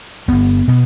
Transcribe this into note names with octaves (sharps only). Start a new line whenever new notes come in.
G1 G2 B3
B2 B3